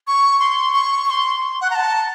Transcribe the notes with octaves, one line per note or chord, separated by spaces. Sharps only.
C#6
C6
C#6
C#6
C6
F#5
A#5
A5